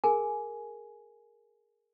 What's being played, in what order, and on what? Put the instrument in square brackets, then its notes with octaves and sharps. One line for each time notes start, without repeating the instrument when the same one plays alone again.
[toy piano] G#4 A#4 G#5